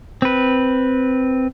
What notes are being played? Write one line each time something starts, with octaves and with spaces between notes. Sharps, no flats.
C4 B4